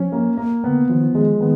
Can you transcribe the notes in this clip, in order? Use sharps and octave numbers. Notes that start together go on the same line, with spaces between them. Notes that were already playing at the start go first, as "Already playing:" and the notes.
Already playing: F3 C#4
A#3
A#3
D3 B3
D#3 F3
D#3 G#3
D#3 B3